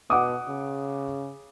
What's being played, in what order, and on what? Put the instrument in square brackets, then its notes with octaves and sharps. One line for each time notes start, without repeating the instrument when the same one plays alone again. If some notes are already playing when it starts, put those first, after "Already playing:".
[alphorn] B2 [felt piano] F#5 D6 D#6
[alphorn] C#3